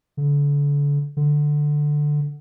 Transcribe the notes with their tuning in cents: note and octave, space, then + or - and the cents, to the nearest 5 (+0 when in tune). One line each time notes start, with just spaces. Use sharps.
D3 -35
D3 +10